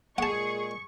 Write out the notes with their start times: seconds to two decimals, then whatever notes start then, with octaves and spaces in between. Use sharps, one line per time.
0.18 A#2 G#3 G#4 F#5 A5 C#6